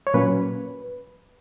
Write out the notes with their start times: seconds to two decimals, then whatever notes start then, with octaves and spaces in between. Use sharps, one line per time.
0.07 C#5
0.14 A#2 F#3 A#3 C#4 B4